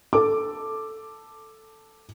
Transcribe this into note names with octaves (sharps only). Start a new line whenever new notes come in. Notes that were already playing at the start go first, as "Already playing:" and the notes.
A4 D6